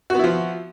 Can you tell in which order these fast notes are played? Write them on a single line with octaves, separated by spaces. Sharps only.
F#4 B3 E4 F3